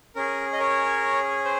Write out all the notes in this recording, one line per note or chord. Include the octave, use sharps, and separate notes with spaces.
C#4 G#4 A#4
D#5
A#4 C#5
C5